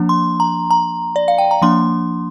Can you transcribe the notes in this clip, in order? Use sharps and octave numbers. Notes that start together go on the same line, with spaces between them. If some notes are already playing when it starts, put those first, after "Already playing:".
Already playing: F3 A#3 D4
C6
A#5
A#5
D5
F5
G5
A#5
F3 A#3 D4 C6